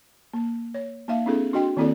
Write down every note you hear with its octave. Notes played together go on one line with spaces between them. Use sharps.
A#3
C#5
A#3 D#4 E5 F5
C4 D4 E4 G#4 A4
D4 F#4 D#5 G5 C6
D#3 A#3 C4 E4 A4 D5